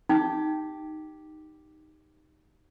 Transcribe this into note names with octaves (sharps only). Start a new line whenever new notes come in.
D#4 G4